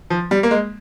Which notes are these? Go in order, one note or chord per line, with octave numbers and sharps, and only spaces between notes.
F3
G3
A#3
G#3